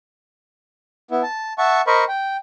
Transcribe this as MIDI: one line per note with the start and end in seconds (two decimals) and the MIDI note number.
1.11 1.22 59
1.11 1.22 64
1.23 1.53 81
1.58 1.81 76
1.58 1.81 78
1.58 1.81 81
1.58 1.81 85
1.87 2.04 70
1.87 2.04 72
1.87 2.04 75
1.87 2.04 83
1.87 2.04 85
2.08 2.37 79